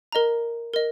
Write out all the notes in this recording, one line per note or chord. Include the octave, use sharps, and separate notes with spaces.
A#4 D#5 A#5
A#4 D#5